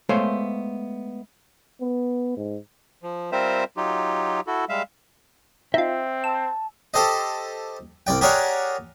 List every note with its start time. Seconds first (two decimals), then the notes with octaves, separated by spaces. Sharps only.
0.09 G#3 A3 B3 C5 C#5 F5
1.81 B3
2.37 G#2
3.03 F3
3.32 G3 C4 F4 A#4 C5 E5
3.77 F#3 D#4 F4 G4
4.47 E4 F#4 A4
4.69 G3 G#3 E5 F5
5.74 C4 D#4 F4 E5
6.24 A5 E6
6.94 G4 A4 C5 D#5
8.07 C2 D5 G5
8.21 G4 G#4 A#4 C#5 D5 F#5